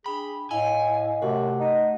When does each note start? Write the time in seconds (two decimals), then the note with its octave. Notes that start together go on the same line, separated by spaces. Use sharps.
0.06 D4 G#4 G5 B5
0.51 A2 E4 D#5 F5 G#5
1.22 F#2 C3 A3 F#4 F#5
1.60 D#4